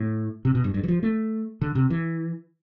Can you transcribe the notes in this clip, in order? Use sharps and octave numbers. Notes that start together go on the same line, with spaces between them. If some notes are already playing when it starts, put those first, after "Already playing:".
Already playing: A2
C3
B2
G2
G2
E3
F3
A3
D3
C3
E3